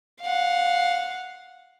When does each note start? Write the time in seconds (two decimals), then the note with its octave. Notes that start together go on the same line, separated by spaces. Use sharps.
0.22 F5 F#5